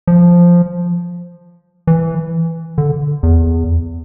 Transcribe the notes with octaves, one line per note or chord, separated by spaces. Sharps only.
F3
E3
D3
E2